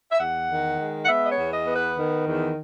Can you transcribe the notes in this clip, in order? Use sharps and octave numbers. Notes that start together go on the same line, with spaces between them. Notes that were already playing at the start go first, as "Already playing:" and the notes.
E5
E2 F#5
D#3
G#3
F#5
B3 E5
D#5
C#5
E2
D#5
B3
B4
D#3
E2